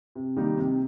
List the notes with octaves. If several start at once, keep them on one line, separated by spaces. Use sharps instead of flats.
C3
D#3 G3 A#3 D#4
C3